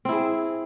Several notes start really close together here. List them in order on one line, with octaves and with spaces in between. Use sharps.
C4 E4 G#4